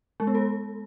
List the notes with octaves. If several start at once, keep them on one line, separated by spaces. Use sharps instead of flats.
G#3
B3
A4